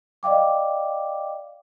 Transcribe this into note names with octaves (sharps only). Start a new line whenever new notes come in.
D5 D#5 F5 G5 D6